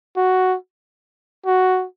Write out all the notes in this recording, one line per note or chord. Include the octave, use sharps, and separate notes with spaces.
F#4
F#4